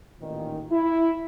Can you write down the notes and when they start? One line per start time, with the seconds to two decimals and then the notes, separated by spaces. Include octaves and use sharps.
0.21 A1 A#2 D#3
0.71 E4